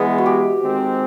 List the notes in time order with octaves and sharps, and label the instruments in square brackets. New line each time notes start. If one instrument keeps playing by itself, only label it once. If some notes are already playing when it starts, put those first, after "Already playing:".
Already playing: [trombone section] E3 G#3 B3 [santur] G#4
[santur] F#4
G4
[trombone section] D#3 G#3 C4